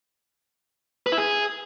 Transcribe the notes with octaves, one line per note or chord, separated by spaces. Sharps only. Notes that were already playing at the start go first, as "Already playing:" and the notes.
B4
E4
G#4